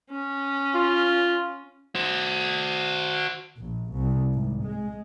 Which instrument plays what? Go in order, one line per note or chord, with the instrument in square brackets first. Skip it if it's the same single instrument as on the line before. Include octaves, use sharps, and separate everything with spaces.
[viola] C#4
[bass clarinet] F4
[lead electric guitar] F#4 C5
[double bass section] A#1
C2
G#1
G#3